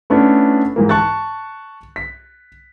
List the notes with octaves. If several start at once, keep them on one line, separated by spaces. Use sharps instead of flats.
A3 B3 C#4 D4 E4
G#2 E3 A#3
A5 C#6 F#6 A6
B6